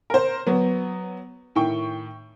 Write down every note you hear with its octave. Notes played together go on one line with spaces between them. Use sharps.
A#4 C5
F#3 B3
A2 D#3 G5 C#6